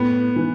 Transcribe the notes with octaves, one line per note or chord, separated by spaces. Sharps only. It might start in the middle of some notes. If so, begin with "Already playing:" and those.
Already playing: A2 B3
E3